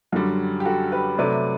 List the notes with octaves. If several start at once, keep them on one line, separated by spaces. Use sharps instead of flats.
F#2 D3 G3 F#4
G4
F#4 A4
G4 B4
C3 F#3 A3 B4 D5